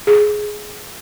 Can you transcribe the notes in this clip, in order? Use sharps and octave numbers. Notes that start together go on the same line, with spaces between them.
G#4